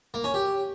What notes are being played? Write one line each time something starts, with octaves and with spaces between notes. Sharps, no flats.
A#3
C#4
G4